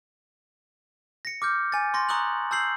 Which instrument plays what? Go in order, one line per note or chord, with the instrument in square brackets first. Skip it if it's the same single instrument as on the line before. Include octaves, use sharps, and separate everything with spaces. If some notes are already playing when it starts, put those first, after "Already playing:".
[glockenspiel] A#6 C#7
D6 F6 G6
G#5 A6
C6 C#6 A#6
A#5 C#6 D#6 F#6 F#7
A5 E6 G6 C7 F#7